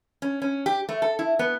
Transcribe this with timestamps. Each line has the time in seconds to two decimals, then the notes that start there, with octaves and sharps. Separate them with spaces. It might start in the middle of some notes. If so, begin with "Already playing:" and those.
0.22 C#4
0.42 C#4
0.66 G4
0.89 A3
1.02 A4
1.19 E4
1.39 B3